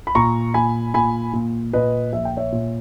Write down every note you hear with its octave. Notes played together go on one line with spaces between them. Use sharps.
B5
A#2 A#5 C#6
A#2 G#5 B5
A#2 G#5 B5
A#2
A#2 B4 D#5
A#1 E5
G5
C#5 E5
A#2